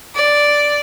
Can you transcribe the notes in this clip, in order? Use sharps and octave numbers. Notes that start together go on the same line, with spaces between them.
D5